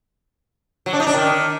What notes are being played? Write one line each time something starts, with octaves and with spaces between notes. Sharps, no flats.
F#3
D4
D#4
D4
D#3